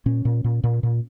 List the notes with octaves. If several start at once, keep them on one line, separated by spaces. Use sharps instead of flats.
A#2 C#4
A#2
A#2
A#2
A#2